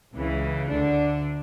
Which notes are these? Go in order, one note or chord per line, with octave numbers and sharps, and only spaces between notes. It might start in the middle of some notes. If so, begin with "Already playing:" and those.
C#2 C#3 E3
D2 D3 D4